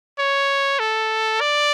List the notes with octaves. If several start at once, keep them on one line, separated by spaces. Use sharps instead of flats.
C#5
A4
D5